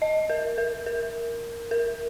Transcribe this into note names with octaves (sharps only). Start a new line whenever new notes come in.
D#5
A#4
A#4
A#4
A#4